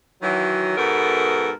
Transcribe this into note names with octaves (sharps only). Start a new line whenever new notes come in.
D#3 E3 F#3
G#2 B2 B3 A4 A#4